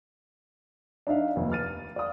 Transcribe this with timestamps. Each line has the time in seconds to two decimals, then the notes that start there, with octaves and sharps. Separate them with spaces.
1.07 D4 D#4 E5 F5
1.36 F1 D#2
1.52 F6 A6 D#7
1.96 D5 F5 D#6